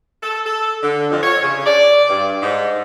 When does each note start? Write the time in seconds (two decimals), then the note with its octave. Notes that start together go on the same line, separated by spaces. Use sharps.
0.22 A4
0.46 A4
0.83 D3
1.10 F2
1.23 C#5
1.43 C#3
1.66 D5
2.10 G2
2.42 G#2